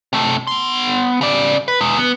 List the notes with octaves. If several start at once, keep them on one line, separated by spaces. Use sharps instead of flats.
C3 A3
B3 C6
C#3 D5
B4
E2 G#3
B3